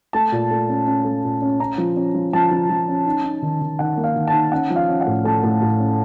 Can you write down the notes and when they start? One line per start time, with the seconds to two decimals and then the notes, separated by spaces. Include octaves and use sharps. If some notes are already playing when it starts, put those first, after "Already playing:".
0.13 A3 A5
0.32 A#2
0.51 A3
0.69 C#4
0.87 C#4
1.05 A3
1.24 A#2
1.42 C#4
1.60 C#4 A#5
1.78 F3
1.96 C#4
2.14 F3
2.33 F3 A5
2.51 F3
2.70 F3
2.88 C#4
3.06 D#4
3.24 D#4
3.42 D#3
3.61 D#3
3.79 D#3 F#5
3.97 A#3
4.04 F5
4.16 D#3
4.28 A5
4.33 D#4
4.52 C#4 F#5
4.70 F3
4.76 F5
4.89 C#4
5.01 F#5
5.07 A2
5.25 A3 A5
5.43 A2
5.62 A2
5.80 C#4